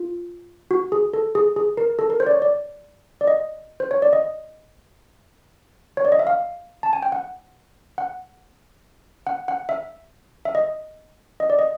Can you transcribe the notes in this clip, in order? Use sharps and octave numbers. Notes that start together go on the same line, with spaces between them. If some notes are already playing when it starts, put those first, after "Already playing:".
Already playing: F4
F#4
G#4
A4
G#4
G#4
A#4
A4
A#4
C5
D5
C#5
D5
D5
D#5
C5
C#5
D5
D#5
C#5
D5
D#5
E5
F5
A5
G#5
G5
F#5
F#5
F#5
F#5
E5
E5
D#5
D#5
D5
D#5